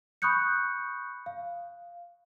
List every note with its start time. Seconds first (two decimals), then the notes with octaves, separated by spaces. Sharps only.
0.22 B5 C#6 D#6 F#6 G6 C#7
1.26 F5